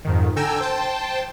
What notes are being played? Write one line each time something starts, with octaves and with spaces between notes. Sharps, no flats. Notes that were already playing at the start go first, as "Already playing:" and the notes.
F2 G#2 D#3
D3 A4 G5 G#5 A#5 E6
C5 G5 A5